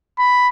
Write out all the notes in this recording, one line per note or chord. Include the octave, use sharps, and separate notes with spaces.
B5